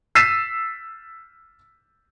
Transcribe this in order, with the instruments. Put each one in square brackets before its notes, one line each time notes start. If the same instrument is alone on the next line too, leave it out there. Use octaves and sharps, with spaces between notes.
[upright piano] E6 A6 B6 C7 D#7 E7